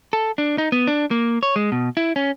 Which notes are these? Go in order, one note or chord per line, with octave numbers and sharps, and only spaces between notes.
A4
D4
D#4
B3
D4
A#3
C#5
G#3
B2
E4
C#4